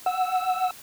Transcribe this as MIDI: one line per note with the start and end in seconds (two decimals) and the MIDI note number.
0.06 0.71 78
0.06 0.71 88